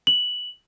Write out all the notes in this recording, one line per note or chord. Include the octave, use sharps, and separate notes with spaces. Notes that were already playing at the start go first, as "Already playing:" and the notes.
F#7